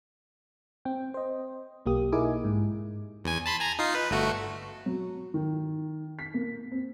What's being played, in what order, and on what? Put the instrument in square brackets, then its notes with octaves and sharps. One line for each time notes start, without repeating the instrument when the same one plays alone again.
[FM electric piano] C4 G5
C5 D#5
B1 A#3 G4 D#6
D#4 E4 G#4 A#4 G#5 D6
G#2
[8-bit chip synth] E2 G#5
A5 B5 C6
G#5 A#5
D#4 F4 C7
B4
G1 A3 F#4
[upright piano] F#3
D#3
B6
A#3
C4